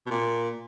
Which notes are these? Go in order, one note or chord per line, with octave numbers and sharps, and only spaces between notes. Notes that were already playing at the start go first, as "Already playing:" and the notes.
B2
A#2